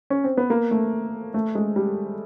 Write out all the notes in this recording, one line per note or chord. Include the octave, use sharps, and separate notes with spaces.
C#4
C4
B3
A#3
A3
A3
G#3
G3